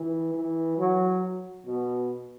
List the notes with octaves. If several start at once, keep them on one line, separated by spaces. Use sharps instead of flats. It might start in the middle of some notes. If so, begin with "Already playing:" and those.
Already playing: E3
E3
F#3
B2